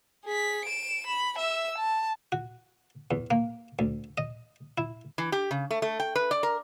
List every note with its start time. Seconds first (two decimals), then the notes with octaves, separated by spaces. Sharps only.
0.25 G#4 B6
0.65 D7 E7
1.07 B5
1.38 E5 E6
1.78 A5
2.32 F#4
3.11 E2
3.31 A#3
3.79 D2
4.18 D#5
4.78 E4
5.18 E3
5.32 G4
5.51 C#3
5.71 A3
5.82 A3
6.00 G5
6.15 B4
6.31 D5
6.43 A#4